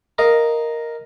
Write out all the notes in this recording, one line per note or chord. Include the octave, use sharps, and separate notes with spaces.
A#4 D#5 F5